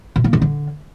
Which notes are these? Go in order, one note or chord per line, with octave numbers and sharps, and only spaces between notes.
B2
A#3
C3
D3